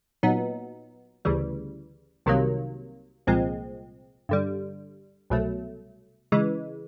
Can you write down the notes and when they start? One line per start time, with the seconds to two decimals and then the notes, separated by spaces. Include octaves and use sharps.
0.23 A#2 F#3 B3 D#4
1.25 D2 C#3 E3 G3
2.26 C2 C3 D#3 F#3 A#3
3.27 C2 A#2 F3 G#3 C4
4.29 G2 D3 G3
5.30 C2 B2 F#3 A3
6.32 C#3 E3 G#3